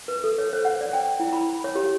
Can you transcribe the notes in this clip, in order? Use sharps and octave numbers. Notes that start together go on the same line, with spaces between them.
B4
A4
C#5
C5
F#5
D5
G5
E4
B5
C#5
G4